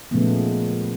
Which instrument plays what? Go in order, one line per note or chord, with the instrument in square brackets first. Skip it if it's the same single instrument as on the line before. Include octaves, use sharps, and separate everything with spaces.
[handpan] A#2 C#3 F3 G#3 A3 B3